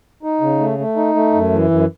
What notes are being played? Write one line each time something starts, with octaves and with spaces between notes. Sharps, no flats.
D#4
C#3
A3
A3
D#4
A3
F#2
E3
F#2